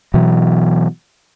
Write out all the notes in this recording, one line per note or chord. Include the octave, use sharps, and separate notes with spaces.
B2 E3 F#3